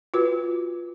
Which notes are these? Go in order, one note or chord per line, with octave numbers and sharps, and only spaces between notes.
F4 F#4 B4